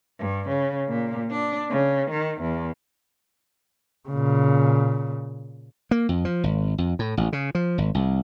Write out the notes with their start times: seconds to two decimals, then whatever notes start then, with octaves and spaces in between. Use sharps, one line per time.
0.20 G2
0.49 C#3
0.89 A#2
1.30 D4
1.70 C#3
2.11 D#3
2.42 E2
4.09 A#2 C#3
5.91 A#3
6.09 F2
6.25 F3
6.44 G#1
6.78 F2
6.99 A2
7.17 A1
7.33 C#3
7.55 F3
7.78 G#1
7.95 C2